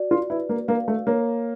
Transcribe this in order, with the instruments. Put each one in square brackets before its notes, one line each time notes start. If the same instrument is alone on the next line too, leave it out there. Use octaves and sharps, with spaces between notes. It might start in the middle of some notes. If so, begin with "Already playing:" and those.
Already playing: [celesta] F#4 D5
[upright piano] F4
[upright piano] E4 [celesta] B4
[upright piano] A#3
[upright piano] A#3 [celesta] F5
[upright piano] A3
[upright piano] A#3 [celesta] C#5